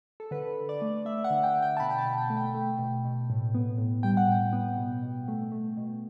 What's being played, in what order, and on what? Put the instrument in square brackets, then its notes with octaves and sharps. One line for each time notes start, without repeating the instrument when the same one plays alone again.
[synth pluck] A4
D3 B4
D3
D5
A3
A3 E5
F#5
D3
G5
D3
G5
A5
B2 B5
G5
A5
B2
G5
A3
G5
A3
B2
B2
A2
B3
A2
G3 G5
F#5
A2 G5
B3
B2
B2
A3
A3
B2